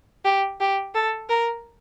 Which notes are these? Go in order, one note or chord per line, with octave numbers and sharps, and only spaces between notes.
G4
G4
A4
A#4